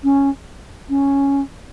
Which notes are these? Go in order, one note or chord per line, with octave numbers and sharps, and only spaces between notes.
C#4
C#4